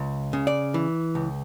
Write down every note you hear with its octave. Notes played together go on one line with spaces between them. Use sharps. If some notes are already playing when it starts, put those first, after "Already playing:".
Already playing: C#2
C#3
D5
E3
C#2